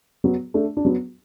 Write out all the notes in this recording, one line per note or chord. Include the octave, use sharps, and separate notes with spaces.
F#3 B3
A3 D4
D4
F#3 B3